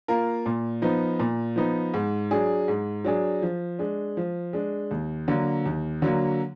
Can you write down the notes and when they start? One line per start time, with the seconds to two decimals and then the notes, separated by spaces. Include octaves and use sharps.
0.08 A#3 F4 A#4
0.46 A#2
0.82 F3 B3 D#4
1.19 A#2
1.56 F3 B3 D#4
1.94 G#2
2.31 F#3 D4 G#4
2.68 G#2
3.05 F#3 D4 G#4
3.42 F3
3.79 G#3 D4
4.17 F3
4.53 G#3 D4
4.91 D#2
5.28 D3 F#3 A#3
5.66 D#2
6.02 D3 F#3 A#3